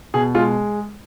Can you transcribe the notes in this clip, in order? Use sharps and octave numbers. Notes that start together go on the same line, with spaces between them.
B2 G#4
G#3 F4